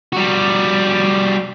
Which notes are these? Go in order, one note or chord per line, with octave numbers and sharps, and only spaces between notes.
G3 F#4